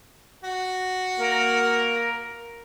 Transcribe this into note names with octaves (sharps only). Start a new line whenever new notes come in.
F#4
A#3 A#4